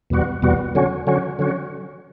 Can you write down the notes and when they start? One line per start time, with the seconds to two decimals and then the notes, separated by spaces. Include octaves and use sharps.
0.10 E2 B2 G3 B3 F#4
0.42 E2 B2 G3 B3 F#4
0.75 D3 F#3 C#4 F#4
1.07 D3 F#3 C#4 F#4
1.39 D3 F#3 C#4 F#4